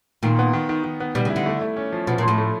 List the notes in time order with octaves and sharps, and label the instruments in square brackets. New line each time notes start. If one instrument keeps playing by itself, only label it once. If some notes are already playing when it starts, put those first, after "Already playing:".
[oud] A#2 [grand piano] D#3
[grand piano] B3
D#3
D#3
D#3
B3
[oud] B2 [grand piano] G3
[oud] C#3
[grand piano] E4
[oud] D3
[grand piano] A3
A3
C#4
F3
[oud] B2 [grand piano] F3
[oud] A#2
[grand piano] F3
[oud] A2
[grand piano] A3